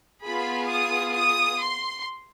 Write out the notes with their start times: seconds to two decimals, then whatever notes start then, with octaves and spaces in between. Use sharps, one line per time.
0.23 B3 F4 G#4 B5
0.69 D#6
1.15 D#6
1.61 C6